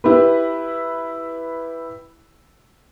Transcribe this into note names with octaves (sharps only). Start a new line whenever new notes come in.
E4 G4 B4